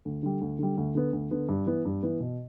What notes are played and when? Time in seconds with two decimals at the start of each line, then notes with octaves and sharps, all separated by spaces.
0.05 D2
0.23 D3 G3
0.41 D2
0.59 D3 G3
0.77 D2
0.95 D3 B3
1.13 D2
1.31 D3 B3
1.49 G2
1.66 E3 B3
1.85 G2
2.03 E3 B3
2.20 B2